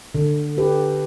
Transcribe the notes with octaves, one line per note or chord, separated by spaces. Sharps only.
D3
D4 G4 B4